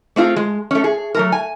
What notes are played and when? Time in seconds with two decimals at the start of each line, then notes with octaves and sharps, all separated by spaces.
0.16 A3 C4 F4 G#4
0.36 G#3
0.71 A3 C#4
0.84 G#4
1.14 F#3 A3 A#4
1.32 G#5